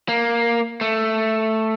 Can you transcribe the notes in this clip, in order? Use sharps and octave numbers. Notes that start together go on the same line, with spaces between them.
A#3
A3